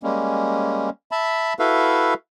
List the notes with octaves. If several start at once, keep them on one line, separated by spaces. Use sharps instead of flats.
G3 G#3 A#3 C#4
E5 A5 B5
E4 F#4 A4 B4 E5 F5